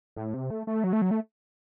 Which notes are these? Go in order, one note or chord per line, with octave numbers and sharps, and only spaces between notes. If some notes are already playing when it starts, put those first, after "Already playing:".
A2
C3
A3
A3
F#3
A3
F#3
A3